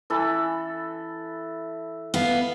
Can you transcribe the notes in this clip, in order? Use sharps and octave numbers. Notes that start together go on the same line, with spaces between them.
E3 A4 B5
B3 F5